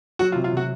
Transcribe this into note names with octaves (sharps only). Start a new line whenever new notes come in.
F#3 F#4
F4
C3
F4
C3 F#4